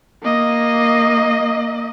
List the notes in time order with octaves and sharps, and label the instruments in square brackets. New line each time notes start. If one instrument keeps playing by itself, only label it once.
[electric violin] A#3 D#5